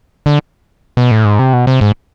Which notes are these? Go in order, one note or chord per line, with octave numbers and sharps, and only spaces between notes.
D3
B2
A2
G#2
C3
B2
C3
G#2